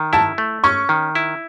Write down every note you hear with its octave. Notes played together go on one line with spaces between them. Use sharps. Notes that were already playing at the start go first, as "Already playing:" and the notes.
Already playing: D#3
E4 A5
A3
C#4 C#6
D#3
E4